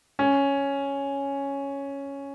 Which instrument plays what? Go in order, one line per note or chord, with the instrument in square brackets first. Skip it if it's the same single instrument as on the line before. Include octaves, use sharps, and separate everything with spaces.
[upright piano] C#4